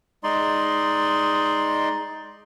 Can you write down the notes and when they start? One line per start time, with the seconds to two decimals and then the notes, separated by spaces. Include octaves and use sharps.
0.24 G#3 D#4 D5 C6